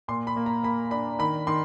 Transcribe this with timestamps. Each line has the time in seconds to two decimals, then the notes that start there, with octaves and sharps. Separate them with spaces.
0.08 A#2 C6
0.27 B5
0.36 A#3
0.46 A#5
0.63 A#3 B5
0.91 D4 B5
1.19 D#3 B5
1.47 D#3 C6